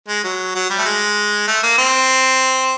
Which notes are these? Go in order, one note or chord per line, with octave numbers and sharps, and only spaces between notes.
G#3
F#3
F#3
G3
A3
G#3
A3
A#3
C4